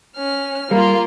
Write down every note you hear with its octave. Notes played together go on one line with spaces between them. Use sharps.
C#4 F6
G3 A#3 F4 A#4